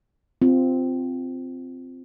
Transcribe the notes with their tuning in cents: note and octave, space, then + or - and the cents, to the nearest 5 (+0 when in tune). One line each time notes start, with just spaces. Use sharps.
C4 -10 F4 +0